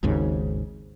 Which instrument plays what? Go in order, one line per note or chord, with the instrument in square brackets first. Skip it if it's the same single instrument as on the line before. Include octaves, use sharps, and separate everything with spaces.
[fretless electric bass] G#1 D#2 G#2 C#3